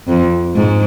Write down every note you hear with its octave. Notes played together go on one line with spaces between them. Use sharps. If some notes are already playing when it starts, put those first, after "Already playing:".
F2
G#2